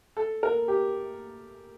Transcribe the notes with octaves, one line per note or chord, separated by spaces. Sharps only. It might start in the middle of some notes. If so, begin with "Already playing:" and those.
A4
A#4
G4